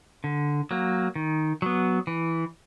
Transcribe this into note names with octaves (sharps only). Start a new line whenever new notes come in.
D3
F#3 A#3
D#3
F#3 B3
E3